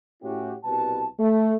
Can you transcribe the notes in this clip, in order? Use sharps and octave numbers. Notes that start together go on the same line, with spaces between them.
A2 C#4 E4 F#4 G4
C2 B2 G3 B4 A5
A3